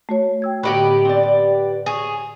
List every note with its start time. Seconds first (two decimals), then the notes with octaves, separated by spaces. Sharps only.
0.09 A3 F#4 C#5
0.42 G5 E6 G#6
0.63 A2 D3 B3 D#4 G4 B4 D#5 F#5
1.05 C4 D5
1.23 D5
1.86 G#4 C#5